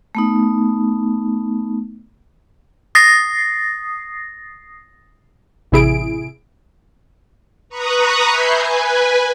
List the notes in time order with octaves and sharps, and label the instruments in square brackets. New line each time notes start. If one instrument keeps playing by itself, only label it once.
[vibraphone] A3 B3 D#4
[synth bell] D#6 A6 A#6 C7
[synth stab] A1 C3 E4 G#4 D7
[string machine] B4 A#5 C#6 D#6 F#6
E5 G#5 B5 G6 C7
B4 G#5